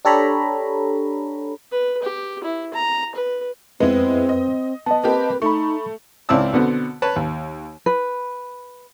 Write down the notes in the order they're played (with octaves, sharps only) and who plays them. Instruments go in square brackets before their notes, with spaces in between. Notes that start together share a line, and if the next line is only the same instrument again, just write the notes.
[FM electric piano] D4 G4 A4 C#5 A#5 B5
[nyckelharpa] B4
G4
E4
A#5
B4
[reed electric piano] F2 B4 [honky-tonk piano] G#3 B3 E4 [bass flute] C4
[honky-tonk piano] D#5
[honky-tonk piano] B3 [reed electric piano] D#5 A5
[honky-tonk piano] A#3 C4 G4 [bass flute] B4
[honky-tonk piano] A3 [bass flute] D#4 [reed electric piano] B5 C#6
[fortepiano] C#2 C4 E4 D5 A5 E6
B2 D3 B3 C4
B4 C#5 A5
D#2
[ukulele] B4